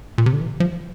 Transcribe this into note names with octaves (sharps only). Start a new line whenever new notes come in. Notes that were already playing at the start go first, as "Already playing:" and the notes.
A#2
C3
D3
E3
F3